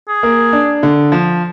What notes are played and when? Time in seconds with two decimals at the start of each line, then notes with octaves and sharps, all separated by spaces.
0.09 G#4
0.23 A#3
0.53 D4
0.83 D3
1.12 F3